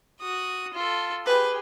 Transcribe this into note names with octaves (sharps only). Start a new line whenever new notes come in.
F#4 D#6
F4 A4
G4 G#4 B4